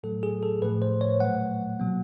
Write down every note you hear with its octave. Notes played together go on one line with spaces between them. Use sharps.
A2 F#3 A3 A4
G#4
A4
A2 F3 A3 B4
C5
C#5
A#2 F#3 A3 F#5
B2 F#3 A#3